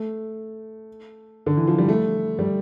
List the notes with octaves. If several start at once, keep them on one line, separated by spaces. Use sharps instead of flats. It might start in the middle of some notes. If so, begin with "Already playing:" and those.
Already playing: A3
D3
E3
F3
G3
A3
G3